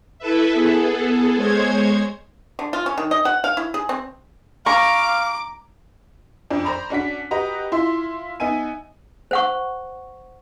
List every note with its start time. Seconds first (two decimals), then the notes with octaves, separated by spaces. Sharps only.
0.19 E4 A4 B4 E5
0.54 B3 G#4 A4
1.36 G#3 C5 C#5 G#6
2.59 D3
2.73 F4
2.86 C#4
2.98 D#3
3.11 D#5
3.25 F#5
3.44 F5
3.57 E4
3.74 G#4
3.89 C4
4.66 F5 A#5 C#6 D6
6.51 F2 F3 D4
6.65 C5 D5 A#5 B5
6.90 C#4 D4 F#4 B6
7.31 F#4 G4 B4 D#5 A#5
7.72 E4 F4 E5 C6
8.40 B3 D#4 E5 G#5 D#7
9.31 C5 F#5 C#6